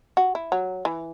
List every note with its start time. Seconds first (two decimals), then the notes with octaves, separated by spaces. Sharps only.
0.17 F#4
0.35 E4
0.52 F#3
0.85 E3